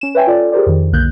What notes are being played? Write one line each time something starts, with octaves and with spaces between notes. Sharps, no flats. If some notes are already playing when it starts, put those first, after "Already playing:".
C#4 E7
B4 C#5 E5 G5 G#5
F4 A4 D5
G4 G#4 A#4 C5 D5
F2 D#3
B1 D3 A#3 F#6 G6